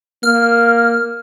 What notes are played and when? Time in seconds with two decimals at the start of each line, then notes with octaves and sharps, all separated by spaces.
0.23 A#3 F6